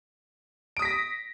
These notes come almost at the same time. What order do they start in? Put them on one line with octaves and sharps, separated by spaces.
D7 D#6 B6 A#6